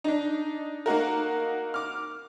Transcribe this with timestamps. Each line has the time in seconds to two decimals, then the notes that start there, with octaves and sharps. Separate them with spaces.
0.04 D4 D#4
0.86 A#3 D#4 F#4 A#4
1.74 D6 F6